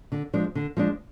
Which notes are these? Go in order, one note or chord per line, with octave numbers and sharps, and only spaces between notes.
D3
F3 G#3 D4
D3
F3 G#3 D4